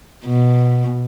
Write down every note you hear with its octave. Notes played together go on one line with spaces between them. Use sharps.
B2